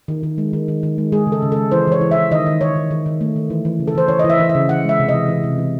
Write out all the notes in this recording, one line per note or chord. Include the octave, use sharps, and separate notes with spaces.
D#3
D#3
G#3
D#3
D#3
D#3
G#3
G#3 G#4
C#3
A4
C#3
G#3 A4
E3 C5
E3 C#5
E3
E5
E3
D#3 D#5
D#3
D#3 C#5
D#3
D#3
D#3
A3
D#3
E3
E3
C#3
A4
E3 C5
E3 C#5
D#5
E3
E5
E3
E5
C#3
E3 F#5
G#3 E5
C3
D#5
E3
E3
C3
E3